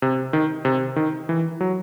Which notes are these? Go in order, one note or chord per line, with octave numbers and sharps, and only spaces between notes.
C3
D#3
C3
D#3
E3
F#3